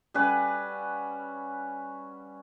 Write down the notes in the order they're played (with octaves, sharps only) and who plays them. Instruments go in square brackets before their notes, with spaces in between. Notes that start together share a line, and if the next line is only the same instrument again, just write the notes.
[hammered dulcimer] G3 C#4 B4 F#5